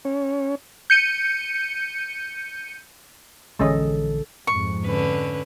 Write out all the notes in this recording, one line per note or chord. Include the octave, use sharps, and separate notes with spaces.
C#4
G6 C#7 D#7
A#1 D3 E3 G#3 C#4 A4 D#5
F2 G#2 C#6
D3 C#4 B4